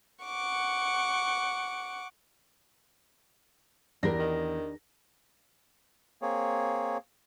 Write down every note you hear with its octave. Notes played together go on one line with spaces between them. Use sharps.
F#5 C#6 D6
E2 D4 G4 A#4 A#6
D#3
A#3 C4 G#4 C#5